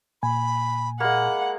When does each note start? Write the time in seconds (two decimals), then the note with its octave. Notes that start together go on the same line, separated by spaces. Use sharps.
0.23 A#2 G#5 B5
1.00 G#3 A#3 F#5 B5